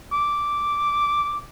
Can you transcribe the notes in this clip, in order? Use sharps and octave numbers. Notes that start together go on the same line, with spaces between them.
D6